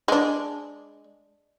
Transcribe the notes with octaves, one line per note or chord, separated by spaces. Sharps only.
G#3 D4